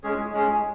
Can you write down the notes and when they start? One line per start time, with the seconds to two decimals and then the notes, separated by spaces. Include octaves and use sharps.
0.04 G#3 C#4 G#4
0.33 G#3 C#4 G#4